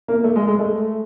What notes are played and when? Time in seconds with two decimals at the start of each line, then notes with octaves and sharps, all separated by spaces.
0.08 A#3
0.24 A3
0.36 G#3
0.47 G#3
0.59 A3